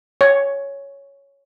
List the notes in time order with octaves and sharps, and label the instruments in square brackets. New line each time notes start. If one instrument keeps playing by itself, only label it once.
[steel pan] C#5